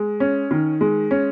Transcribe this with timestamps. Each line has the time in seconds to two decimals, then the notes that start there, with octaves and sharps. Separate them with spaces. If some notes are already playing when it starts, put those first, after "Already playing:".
Already playing: G#3
0.20 C#4
0.51 D#3
0.81 G#3
1.11 C#4